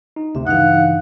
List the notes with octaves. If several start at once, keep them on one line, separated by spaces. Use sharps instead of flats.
D#4
D2 C3 E5
G2 C#3 E3 D#4 F5 F#5